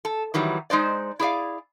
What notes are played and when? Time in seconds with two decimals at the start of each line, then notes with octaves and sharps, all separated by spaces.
0.05 A4
0.34 D#3 E3 F#3 G3
0.70 G#3 D#4 C5 D5
1.20 E4 G#4 D5 F5